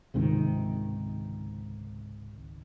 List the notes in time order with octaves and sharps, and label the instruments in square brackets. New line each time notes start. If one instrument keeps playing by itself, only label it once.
[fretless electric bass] C#2 G#2 C3 D#3